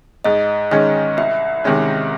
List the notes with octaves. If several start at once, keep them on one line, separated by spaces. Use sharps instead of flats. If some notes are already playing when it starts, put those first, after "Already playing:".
G#2 D#5
D#3 G#3 C#4 D#5
C2 E5
C3 D#3 G#3 C#4